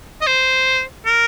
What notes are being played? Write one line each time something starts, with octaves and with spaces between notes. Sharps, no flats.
D#5
C5
A#4